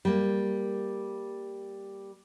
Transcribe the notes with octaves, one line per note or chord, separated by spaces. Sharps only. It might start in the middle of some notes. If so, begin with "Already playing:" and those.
G3 A#3